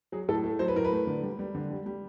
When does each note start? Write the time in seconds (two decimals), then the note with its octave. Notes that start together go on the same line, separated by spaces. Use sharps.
0.12 F#3 G#4
0.28 A2 A4
0.44 A3
0.59 F#3 C5
0.68 B4
0.76 A2 A#4
0.84 B4
0.92 A3
1.07 D3
1.23 G3
1.39 G3
1.55 D3
1.71 G3
1.86 G3